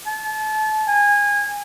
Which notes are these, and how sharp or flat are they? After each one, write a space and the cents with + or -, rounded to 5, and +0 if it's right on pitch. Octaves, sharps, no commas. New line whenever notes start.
A5 -30
G#5 -25